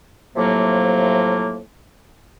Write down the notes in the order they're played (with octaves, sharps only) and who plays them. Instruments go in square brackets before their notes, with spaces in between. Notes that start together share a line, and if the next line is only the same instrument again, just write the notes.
[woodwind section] A2 C3 F3 F#3 A#3